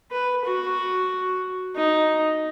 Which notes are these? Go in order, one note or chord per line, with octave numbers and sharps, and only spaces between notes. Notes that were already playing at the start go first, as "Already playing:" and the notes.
B4
F#4
D#4